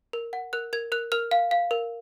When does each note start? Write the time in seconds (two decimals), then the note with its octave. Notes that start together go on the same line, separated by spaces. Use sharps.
0.13 A#4
0.33 F#5
0.53 A#4 F#6
0.73 A#4 G#6
0.92 A#4 F#6
1.12 A#4 F6
1.31 F5
1.51 F5
1.71 A#4